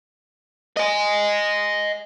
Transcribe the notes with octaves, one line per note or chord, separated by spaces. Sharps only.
D#5 G#5